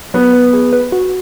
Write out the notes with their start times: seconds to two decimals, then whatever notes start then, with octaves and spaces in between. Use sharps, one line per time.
0.14 F#3 B3
0.33 B4
0.53 G#4
0.73 B4
0.92 F#4